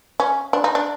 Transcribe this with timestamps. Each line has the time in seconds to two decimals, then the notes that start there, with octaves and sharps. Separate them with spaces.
0.20 C#4
0.53 D4
0.64 D#4
0.75 D4